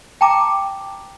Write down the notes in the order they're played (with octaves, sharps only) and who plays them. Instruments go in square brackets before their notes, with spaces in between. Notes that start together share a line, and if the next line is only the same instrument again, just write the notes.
[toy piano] G5 A5 A#5 D6